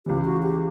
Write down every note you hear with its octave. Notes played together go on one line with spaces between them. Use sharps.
C#2 C#3 E3 G4
F#4
G4